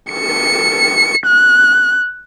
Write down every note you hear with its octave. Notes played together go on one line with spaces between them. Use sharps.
C#7
F#6